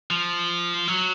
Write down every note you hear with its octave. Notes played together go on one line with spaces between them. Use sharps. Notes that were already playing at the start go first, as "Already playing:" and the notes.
F3
F#3